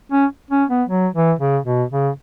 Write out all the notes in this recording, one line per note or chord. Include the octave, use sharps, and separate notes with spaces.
C#4
C#4
B3
F#3
E3
C#3
B2
C#3